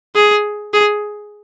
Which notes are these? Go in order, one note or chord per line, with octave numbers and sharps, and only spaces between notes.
G#4
G#4